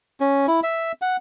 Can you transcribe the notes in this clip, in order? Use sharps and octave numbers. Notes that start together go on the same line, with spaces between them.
C#4
E4
E5
F#5